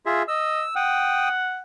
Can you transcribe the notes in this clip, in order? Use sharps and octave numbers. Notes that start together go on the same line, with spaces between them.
F4 G#4 E5
D#5 E6
F#5 G5 D#6